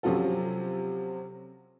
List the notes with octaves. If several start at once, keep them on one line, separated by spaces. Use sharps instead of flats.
C3 F3 F#3 C#4 F4 A4